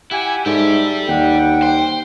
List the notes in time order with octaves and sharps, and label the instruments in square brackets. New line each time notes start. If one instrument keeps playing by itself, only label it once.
[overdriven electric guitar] E4 [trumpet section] G4 F#5 G#5
[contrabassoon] G#2 [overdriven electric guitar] G4 D5 [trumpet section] A4 E5
[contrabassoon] D#2 [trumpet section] G3 F#5 [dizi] G5
[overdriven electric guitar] C5